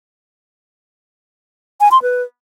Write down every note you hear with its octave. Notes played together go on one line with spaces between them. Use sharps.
G#5
C6
B4